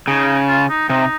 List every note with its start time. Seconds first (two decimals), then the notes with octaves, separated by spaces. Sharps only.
0.08 C#3 D#4
0.48 F4
0.69 D#4
0.89 C3 D#4